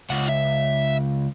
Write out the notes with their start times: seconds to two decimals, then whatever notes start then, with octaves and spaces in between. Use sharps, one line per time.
0.10 C#2 F4 F#5
0.29 E5